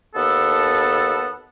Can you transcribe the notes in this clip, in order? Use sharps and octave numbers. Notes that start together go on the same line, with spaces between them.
D#2 B3 A4